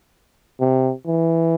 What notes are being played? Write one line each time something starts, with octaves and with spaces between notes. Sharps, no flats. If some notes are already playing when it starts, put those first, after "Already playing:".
C3
E3